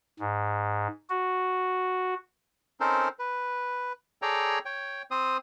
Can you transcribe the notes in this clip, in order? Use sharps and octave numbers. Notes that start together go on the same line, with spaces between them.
G#2
F#4
C4 C#4 D#4 A4 A#4 C5
B4
G#4 A4 C#5 D5 G5 A#5
C#5 G5
C4 C5 D#6